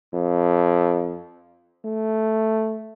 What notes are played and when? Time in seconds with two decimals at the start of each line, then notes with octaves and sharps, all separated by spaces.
0.14 F2
1.85 A3